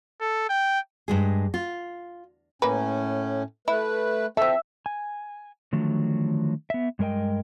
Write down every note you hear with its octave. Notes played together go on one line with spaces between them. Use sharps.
A4
G5
G2 G#3 G#4
F4
A2 A#3 C#4 A#4 B4
A3 E4 B4
F3 C4 A4 E5
G#5
D3 D#3 F3 F#3 A3
B3 E5
G2 G#3 A#4 D#5 G5